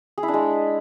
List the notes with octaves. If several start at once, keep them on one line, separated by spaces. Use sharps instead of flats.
G#4
E4
D4
G#3